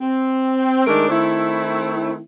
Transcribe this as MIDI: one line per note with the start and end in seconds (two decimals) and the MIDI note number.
0.01 0.84 60
0.87 1.07 51
0.87 1.07 56
0.87 1.07 57
0.87 1.07 62
0.87 1.07 63
0.87 1.07 70
1.08 2.18 51
1.08 2.18 57
1.08 2.18 60
1.08 2.18 64